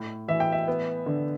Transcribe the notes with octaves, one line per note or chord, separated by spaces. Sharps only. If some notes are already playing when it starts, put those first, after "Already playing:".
Already playing: A2
E3 E5
G5
E5
B3
D3